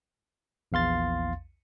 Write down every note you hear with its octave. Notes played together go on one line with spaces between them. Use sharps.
A#1 E2 F5 C6 A6